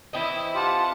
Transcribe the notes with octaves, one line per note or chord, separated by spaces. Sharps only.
E3 C4 E4 D#5
F4 G4 F#5 A5